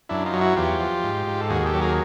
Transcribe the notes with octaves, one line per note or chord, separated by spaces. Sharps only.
F#2 D4 E4
D#4 F4
F#3
E4 F#4
E2 F4 G4
F3
G#2
G#2
A4
D#2 F#4 G#4
G4 A4
F#3
G#4 A#4